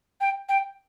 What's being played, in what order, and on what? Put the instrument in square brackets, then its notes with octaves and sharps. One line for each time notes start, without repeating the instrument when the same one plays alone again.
[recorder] G5
G5